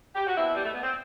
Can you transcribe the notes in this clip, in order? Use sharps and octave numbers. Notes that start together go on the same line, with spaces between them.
G4
F#4
B2 C4 E4
G3
B2 A3
B3
C4